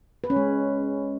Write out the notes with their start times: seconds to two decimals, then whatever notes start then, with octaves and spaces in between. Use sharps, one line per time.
0.24 B4
0.30 C#4
0.36 G#3